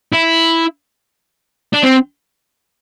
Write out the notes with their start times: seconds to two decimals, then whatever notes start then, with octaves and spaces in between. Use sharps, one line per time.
0.13 E4
1.74 D4
1.83 C4